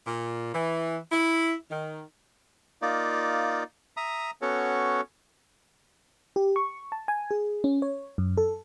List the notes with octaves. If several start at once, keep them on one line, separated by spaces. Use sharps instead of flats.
A#2
E3
E4
D#3
A#3 D#4 F4 D5
E5 A#5 D#6
B3 C#4 F#4 A4 C#5
G4
C#6
A5
G#5
G#4
C#4
C#5
F#2
A4